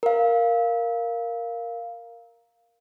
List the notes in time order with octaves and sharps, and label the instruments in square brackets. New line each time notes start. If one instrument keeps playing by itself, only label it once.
[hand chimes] A#4 F5